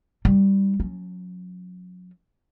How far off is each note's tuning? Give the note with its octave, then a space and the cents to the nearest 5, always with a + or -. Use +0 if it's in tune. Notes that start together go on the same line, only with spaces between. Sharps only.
G3 +0 D#4 +0
F#3 -35 C#4 +0